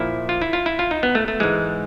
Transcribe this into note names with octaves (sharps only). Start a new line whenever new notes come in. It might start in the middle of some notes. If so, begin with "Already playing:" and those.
Already playing: A#2 F3 E4
F4
E4
F4
E4
F4
D#4
B3
A3
A3
G#2 E3 G#3